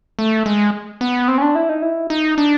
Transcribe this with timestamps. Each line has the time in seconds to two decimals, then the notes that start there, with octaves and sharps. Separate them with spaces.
0.19 A3
0.46 G#3
1.01 B3
1.28 C4
1.38 C#4
1.42 D4
1.55 E4
1.69 D#4
1.82 E4
2.10 D#4
2.38 D4